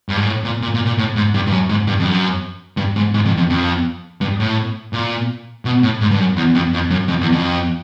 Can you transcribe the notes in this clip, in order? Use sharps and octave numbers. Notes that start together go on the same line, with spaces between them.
G2
G#2
A2
A#2
A#2
A#2
A#2
A2
G#2
G2
G2
F#2
G#2
G2
F2
F#2
G2
G#2
G#2
F2
F2
F2
G2
A2
A#2
B2
A2
G#2
G2
F#2
E2
F2
F2
F#2
F2
E2
F2